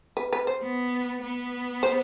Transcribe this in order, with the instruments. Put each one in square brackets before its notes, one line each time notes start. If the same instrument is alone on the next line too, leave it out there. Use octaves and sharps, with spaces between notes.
[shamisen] B4
B4
C5
[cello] B3
B3
[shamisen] C5